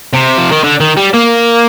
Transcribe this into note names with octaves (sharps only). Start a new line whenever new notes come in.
C3
F3
D#3
D3
D#3
G3
A#3